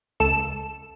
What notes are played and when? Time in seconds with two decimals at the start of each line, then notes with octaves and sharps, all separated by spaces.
0.20 C#2 A4 E7